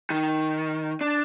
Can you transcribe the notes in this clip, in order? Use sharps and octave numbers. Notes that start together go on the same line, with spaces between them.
D#3
D4